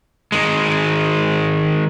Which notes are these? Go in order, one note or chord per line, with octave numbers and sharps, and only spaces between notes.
D#3 G#3